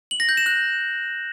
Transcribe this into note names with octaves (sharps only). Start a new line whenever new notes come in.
F#7
A#6
G6
E7
F#6